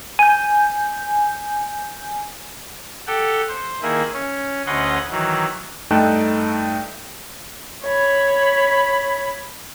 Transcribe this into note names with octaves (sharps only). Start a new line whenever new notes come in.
G#5 G6 D#7
G4 A4 F#5 G5
C5
D#3 A#3 E4 G#4
C#4
D2 C#4 B4 D#5 F#5 C6
D#3 E3 F#3
G2 A3 D#4 G5 A5 F#6
C#5 B5